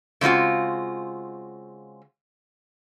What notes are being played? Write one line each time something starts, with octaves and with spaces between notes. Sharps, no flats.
C#3 G#3 C4 F4 F#4